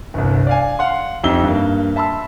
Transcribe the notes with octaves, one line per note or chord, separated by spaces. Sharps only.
G1 C2
D5 F5 G#5
F5 F#5 C6
F2 D#4 G4 E5 E6 G7
G2 A#3
E5 A5 B5 C6 E6